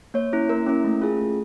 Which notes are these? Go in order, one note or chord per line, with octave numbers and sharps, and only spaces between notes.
A#3 C#5
C#4 E4
A#3 A#4
C#4 E4
A3
C#4 F4 G#4
A3